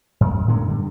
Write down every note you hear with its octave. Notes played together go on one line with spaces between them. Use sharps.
F#2
A2 D3 G#3 B3
D3 G3